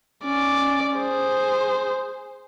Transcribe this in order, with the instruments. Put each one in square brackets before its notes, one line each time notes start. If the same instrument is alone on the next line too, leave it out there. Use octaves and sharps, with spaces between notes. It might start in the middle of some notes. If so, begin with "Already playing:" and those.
[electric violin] C#4 D5
G#4 C5